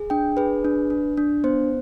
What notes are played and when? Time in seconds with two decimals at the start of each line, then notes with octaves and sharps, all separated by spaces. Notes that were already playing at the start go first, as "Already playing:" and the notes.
Already playing: G#4
0.10 D4 G5
0.37 G#4 B4
0.64 D4
0.90 D4
1.17 D4
1.44 B3 C5